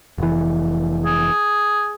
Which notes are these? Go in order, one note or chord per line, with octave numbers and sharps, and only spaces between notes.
F1 E3
G#4